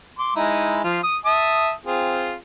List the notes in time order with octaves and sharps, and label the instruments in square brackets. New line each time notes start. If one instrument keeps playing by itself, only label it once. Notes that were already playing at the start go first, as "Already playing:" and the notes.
[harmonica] C6 D6
G#3 D#4 E4
F3 F4
D#6
E5 A5 D#6
C4 F4 G#4